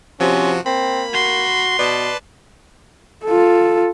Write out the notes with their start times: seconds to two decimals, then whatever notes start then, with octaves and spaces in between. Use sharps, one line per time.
0.20 C3 F3 C#4 F#4
0.66 A#3 C4 B5
1.13 F#4 C6
1.79 B2 B4 D5 A5
3.25 F4 A4